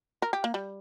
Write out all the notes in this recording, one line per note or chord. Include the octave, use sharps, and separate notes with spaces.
A#4
G4
A#3
G3